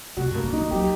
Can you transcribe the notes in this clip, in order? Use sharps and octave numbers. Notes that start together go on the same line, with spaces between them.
C3 F#4
G2
A#3
D3
D#3 D#4
F#3 G4